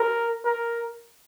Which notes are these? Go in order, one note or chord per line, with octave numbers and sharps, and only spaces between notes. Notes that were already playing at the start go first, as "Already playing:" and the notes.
Already playing: A#4
A#4